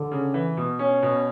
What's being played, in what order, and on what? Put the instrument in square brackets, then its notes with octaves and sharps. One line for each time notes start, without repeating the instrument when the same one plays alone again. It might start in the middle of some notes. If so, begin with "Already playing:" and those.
Already playing: [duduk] D3
[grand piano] C#3
E3
B2
C#4
B2